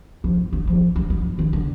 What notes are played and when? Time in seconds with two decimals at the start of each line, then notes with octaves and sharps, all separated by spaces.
0.24 F3
0.53 F#3
0.67 F3
0.96 F#3
1.10 F#3
1.39 D#3
1.53 D3